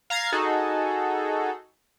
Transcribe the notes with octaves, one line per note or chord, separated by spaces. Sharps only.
F5 A#5 G#6 A6 C7
D#4 F#4 G#4 A4